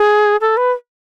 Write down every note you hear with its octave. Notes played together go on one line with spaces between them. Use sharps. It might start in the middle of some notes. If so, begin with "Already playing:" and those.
Already playing: G#4
A4
B4